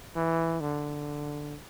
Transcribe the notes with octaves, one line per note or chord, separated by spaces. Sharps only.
E3
D3